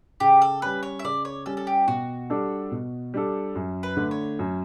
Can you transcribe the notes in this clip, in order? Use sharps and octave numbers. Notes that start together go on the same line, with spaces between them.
C#3 G4
A4
G3 C#4 B4
C#5
E5
C#3 D5
C#5
G3 C#4 A4
A4
G4
B2 F#4
G3 D4 A4
B2
G3 D4 A4
F#2
B4
D3 A3
C#5
F#2